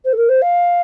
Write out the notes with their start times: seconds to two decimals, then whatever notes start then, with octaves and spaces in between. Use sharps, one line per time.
0.04 C5
0.13 A4
0.17 A#4
0.28 C5
0.41 F5